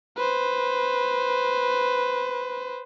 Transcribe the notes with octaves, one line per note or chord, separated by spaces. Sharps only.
B4 C5